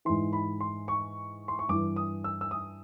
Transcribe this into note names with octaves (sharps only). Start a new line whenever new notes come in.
G#2 E3 C6
B5
C6
C#6
C6
C#6
G2 E3 D6
D#6
E6
E6
D#6